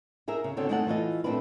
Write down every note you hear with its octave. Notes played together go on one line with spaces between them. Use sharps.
D#4 G#4 A#4 E5
C#3
D3 D#3 C4 F#4 A4 C#5
G#3 A3 C4 D#4 A4 F#5
E3 A3 F4 D#5
A#2 A3 C4 D4 E4 B4